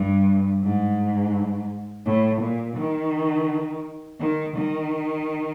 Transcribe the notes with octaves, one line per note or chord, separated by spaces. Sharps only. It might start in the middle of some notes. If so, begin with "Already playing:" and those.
Already playing: G2
G#2
A2
A#2
D#3
D#3
D#3